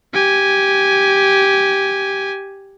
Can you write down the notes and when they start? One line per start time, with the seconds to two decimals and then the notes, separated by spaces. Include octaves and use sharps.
0.14 G4 G#5